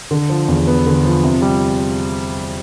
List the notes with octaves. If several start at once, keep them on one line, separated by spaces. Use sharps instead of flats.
D3
F3
E2
B3
D3
F3
C3
G3